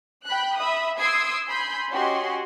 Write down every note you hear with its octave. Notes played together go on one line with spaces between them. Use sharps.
G5 B5 F#6
E5 B5 D#6
C6 D#6 E6 G#6 C7 D7
G#5 B5 C6 G6
C#4 F#4 G4 D#5 G#5 C6